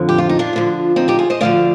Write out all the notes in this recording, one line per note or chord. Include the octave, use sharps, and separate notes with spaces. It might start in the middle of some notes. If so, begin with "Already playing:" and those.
Already playing: F2 D3 F3
G4
F4
D#4
D4 F4
D2 D3 F3
C4 D#4
D#4 G4
F4 G#4
C5 D#5
D2 D3 F3 D5 F5